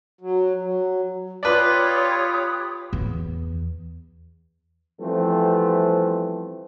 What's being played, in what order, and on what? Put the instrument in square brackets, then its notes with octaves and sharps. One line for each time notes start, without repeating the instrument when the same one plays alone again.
[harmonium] F#3
F#3
[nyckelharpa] F4 [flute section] G4 B5 D#6 [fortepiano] B4 D5 [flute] C#5
[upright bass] E2
[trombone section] E3 F3 G3 A3 B3 C4